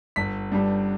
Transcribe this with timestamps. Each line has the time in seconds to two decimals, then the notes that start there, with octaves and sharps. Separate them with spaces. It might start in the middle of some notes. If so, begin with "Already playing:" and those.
0.16 G1 B6
0.52 G2 G3